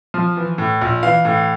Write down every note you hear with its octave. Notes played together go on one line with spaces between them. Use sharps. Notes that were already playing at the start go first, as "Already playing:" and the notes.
F3
E3
A2
A#1
E3 F5
A2